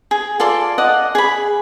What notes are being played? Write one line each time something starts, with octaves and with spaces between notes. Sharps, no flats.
G#4
F4 A4 D5 C6
D5 D#5 F#5
G#4 B5